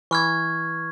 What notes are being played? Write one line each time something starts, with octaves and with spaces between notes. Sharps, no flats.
E3 C#6 F6 G#6